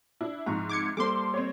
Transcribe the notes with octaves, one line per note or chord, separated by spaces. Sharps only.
D4 E4
G#2 C3 F3 A#5 C#6
D6 G#6 C#7
G3 A#3 A4 C5 C6 D6
C4 C#5